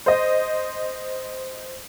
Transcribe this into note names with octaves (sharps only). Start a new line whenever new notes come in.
C5 D#5